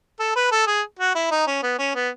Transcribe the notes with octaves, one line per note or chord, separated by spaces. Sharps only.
A4
B4
A4
G#4
F#4
E4
D#4
C#4
B3
C#4
B3